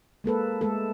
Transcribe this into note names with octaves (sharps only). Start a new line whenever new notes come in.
G#3 A#3 A4 B4
G#3 A3 A4